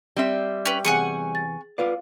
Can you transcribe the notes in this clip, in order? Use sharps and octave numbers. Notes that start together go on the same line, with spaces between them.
G3 C4 E5
C#4 B4 G5
E2 C3 G#4 F#5 G#5 C#6 C#7
A6
F4 B4 D5 F5